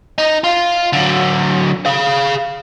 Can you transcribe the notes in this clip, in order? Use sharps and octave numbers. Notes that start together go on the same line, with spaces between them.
D#4
F4
D3 F#3
G#4 F5